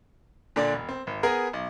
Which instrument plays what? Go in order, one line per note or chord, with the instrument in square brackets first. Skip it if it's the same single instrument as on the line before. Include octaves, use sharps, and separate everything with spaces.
[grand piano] A#2 D3 D4 D5
E1
C4
G#1
B3 G#4 A#4
B1